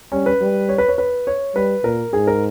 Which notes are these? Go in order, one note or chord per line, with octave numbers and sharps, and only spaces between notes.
G3 C#4
B4
G3
C#5
B4
C#5
B4
C#5
G3 B4
A#2 A#4
G#2 G#4
A#4